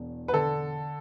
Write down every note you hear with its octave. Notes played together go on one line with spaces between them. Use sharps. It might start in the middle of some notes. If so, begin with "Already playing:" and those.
Already playing: E1 E2
B4
D3 A4